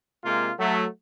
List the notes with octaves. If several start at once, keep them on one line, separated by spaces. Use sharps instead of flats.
C3 G#3 A#3 F4
F#3 A3